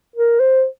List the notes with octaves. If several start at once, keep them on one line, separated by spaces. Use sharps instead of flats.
A#4
C5